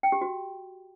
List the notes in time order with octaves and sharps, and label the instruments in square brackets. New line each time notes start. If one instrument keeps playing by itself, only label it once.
[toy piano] G5
G4
F#4